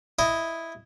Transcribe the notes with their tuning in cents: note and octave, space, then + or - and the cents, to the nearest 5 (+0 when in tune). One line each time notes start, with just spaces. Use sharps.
E4 +0 D#5 +0